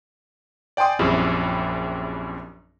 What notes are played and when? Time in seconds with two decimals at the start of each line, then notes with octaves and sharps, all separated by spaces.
0.77 D5 G5 G#5 C6 D#6
0.99 A#1 F#2 G3 C4 E4 G#4